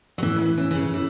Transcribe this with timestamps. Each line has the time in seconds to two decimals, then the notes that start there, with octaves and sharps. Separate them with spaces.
0.18 F#3
0.23 A2 E3
0.40 E3
0.57 E3 C#4
0.71 E3
0.75 C#3
0.94 E3 E4